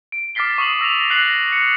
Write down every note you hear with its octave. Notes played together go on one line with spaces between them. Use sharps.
D7
D6 F6 A6 B6 C7 G7
C#6 D#6 C7 F#7
E6 A#6 E7 F7
F#6 A#6 C7 F#7
C#7